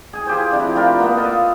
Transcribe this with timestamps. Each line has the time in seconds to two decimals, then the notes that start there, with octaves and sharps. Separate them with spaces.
0.13 G#4 G#5
0.27 F4 G4 G#4 C5
0.51 C3 F3 D4 E4
0.76 D4 F4 G4 A#4
1.00 A#3 B3
1.17 A4 D#5 F5